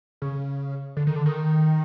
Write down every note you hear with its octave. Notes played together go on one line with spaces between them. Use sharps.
C#3
D3
D#3
D3
D#3